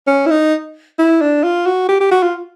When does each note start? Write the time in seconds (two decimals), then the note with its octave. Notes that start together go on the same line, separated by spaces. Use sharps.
0.07 C#4
0.26 E4
0.31 D#4
0.99 E4
1.21 D4
1.43 F4
1.66 F#4
1.89 G4
2.01 G4
2.11 F#4
2.23 F4